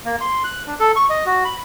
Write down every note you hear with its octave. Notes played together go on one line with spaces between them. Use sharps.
A#3
C6
F#6
D4
A4
C#6
D#5
F#4
B5